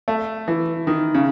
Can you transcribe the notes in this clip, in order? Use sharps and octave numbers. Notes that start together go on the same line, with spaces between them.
A3
E3
D#3
C#3